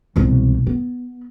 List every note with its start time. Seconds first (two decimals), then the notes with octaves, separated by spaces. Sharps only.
0.16 E1 C2
0.67 B3